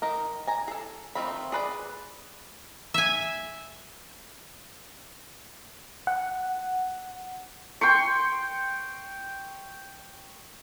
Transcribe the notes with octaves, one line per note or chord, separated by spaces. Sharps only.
D#3 D#4 A#4
G#5 A#5
G#4 A4
D#3 F3 A3 C4 B5
G#4 B4 D5
E5 G#5
F#5
G5 C6 C#6